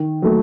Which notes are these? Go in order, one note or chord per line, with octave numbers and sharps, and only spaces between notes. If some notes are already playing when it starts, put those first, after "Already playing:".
Already playing: D#3
F#3 A3